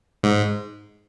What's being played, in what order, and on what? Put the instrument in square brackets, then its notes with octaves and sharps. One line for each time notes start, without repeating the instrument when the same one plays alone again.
[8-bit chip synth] G#2